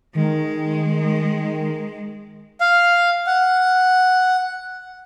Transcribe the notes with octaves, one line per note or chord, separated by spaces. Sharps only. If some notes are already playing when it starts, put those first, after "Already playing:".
D#3 G#3
F5
F#5